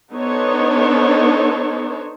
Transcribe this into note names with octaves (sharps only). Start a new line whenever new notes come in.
B3 D4 D#4 A4 C5 C#5